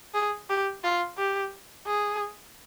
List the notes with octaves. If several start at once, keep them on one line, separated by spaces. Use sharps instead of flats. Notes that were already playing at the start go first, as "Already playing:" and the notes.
G#4
G4
F4
G4
G#4